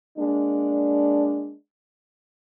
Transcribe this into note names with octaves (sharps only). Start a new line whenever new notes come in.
G#3 A#3 D4